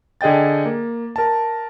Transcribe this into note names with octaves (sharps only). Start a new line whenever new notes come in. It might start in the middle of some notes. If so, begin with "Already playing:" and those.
D3 G#4 D#5 G5 A6
A#3
A#4 A5